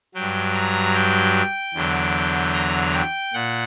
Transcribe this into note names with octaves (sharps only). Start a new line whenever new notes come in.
G2 F#3 G5
A#5
G5
E2 D3 F#3
A#5
G5
A#2 F#5